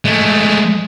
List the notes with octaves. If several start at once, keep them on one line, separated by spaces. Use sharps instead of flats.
G#3 A3